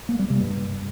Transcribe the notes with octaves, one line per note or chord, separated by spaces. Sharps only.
A#3
G3
C3
G2